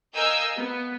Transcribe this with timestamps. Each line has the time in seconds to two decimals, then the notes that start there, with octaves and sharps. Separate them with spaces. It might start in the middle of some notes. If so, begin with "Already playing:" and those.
0.14 A#4 D#5 F5 G#5 E6 G6
0.57 B3